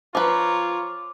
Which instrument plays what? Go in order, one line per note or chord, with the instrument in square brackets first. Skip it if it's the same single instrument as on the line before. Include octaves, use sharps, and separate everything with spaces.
[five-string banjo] F3 B4 [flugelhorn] F4 [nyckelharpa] C#5 A#5 [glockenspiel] D6